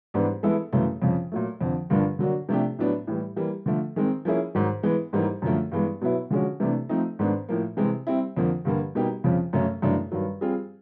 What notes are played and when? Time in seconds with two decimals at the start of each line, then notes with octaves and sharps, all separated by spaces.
0.14 G#2 E3 G3 B3 D4
0.43 E3 G#3 B3 E4 A4
0.73 F#2 C#3 E3 A3
1.02 F2 C#3 F3
1.32 A#2 F#3 A3
1.61 F2 D3 F3
1.90 G2 D3 F3 A#3 D4
2.19 D3 F#3 A#3 D4 F#4
2.49 C3 F3 A3 D4 G4
2.79 A2 F#3 B3 D4
3.07 A2 E3 G3
3.36 E3 G3 A#3
3.66 D3 F3 A3
3.96 D#3 G#3 C4
4.25 F3 A#3 C#4 E4 G#4
4.55 G#2 D#3 F#3
4.83 E3 G#3 B3
5.13 G#2 E3 G3 A#3 D#4
5.42 F#2 D3 F3 A3
5.72 G2 E3 G#3 B3
6.01 B2 F#3 B3 E4
6.30 D3 F3 G#3 C#4 F#4
6.60 C3 E3 A3 D4
6.89 F3 A3 C4 D#4
7.19 G#2 D#3 G#3 B3 D4
7.49 A2 F3 A#3
7.77 C3 E3 G#3 C4
8.07 G3 C4 E4
8.37 F2 D3 F3 A#3
8.65 G2 D3 G3 A#3
8.95 B2 G3 A#3 D#4 G4
9.24 F2 C#3 F3
9.53 F#2 C#3 F#3 A3 C#4
9.82 F#2 C#3 E3 A3 D4
10.12 G2 D#3 F#3
10.41 G3 C4 F4 G#4